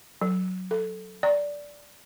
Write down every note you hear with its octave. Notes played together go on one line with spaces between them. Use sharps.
F#3
A4
D5